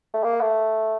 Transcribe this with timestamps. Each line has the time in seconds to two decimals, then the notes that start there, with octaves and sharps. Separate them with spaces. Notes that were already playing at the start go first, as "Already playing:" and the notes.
0.14 A3
0.24 A#3
0.41 A3